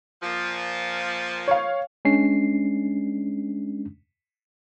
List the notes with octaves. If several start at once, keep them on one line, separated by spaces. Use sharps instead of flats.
A#2 F3
C#5 F5
G#3 C#4 D4 C7